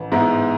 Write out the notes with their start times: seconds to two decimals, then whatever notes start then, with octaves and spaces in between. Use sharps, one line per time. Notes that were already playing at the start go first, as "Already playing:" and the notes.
Already playing: A1
0.12 G#2 G#3 B3 E4